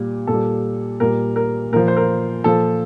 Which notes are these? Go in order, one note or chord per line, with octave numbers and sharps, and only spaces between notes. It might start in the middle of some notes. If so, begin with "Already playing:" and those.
Already playing: A#2 G3
A#2 A4
G3
A#2 G3 A#4
A#4
A#2 F3 A#4
C5
A#4
A#2 F3 A4